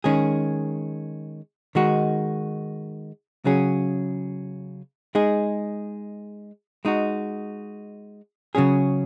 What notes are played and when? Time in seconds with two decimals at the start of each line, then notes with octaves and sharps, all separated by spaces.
0.04 D#3 G#3 C#4 G#4
1.75 D#3 G#3 D#4 F#4
3.45 C#3 F#3 C#4 G#4
5.15 G#3 D#4 G#4
6.85 G#3 D#4 F#4
8.55 C#3 F#3 C#4 G#4